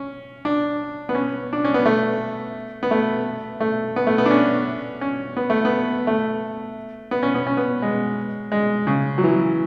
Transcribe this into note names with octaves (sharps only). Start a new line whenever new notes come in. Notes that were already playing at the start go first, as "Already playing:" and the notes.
Already playing: C#4
D4
B3
C#4
D4
C#4
B3
A3
B3
A3
A3
B3
A3
B3
D4
C#4
C#4
B3
A3
B3
A3
B3
C#4
B3
C#4
B3
G#3
G#3
C#3
F#3
E3